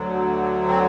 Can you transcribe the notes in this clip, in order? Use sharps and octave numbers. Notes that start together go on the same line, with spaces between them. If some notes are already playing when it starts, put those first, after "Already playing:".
Already playing: D2 D3 F#3
C4